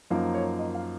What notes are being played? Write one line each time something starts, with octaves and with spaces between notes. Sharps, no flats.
F#2 F3 A#3 D#4 A#4
C#5
D#5
F5